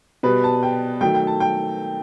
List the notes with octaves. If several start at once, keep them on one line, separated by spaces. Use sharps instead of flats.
B2 G3 B4
A5
G5
D#3 F#3 A3 G5
G5
A5
G5